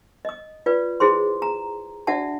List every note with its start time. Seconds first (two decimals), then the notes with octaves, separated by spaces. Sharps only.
0.25 D#5 D#6
0.66 F4 B4 D5
1.00 E4 G#4 C5 C6
1.42 A#5
2.07 D4 F#4 D5 E5 F#5 A5